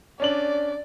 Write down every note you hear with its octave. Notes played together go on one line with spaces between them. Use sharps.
C#4 D4 D5 F#7